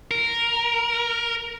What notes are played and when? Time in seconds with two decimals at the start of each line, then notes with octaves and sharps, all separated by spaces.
0.11 A#4